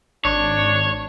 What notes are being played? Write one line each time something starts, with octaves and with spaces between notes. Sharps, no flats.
G#1 D4 C#5